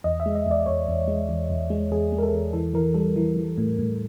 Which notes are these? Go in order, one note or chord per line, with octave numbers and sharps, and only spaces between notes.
E2 D#5
E5
G#3
D#5
E2 D5
E2 C#5
E2
G#3
E2
E2
G#3
E2 G#4
G#3
A#4
A4
E2
E3 A4
E3 A#4
G3 A4
E3
E3
A2
A2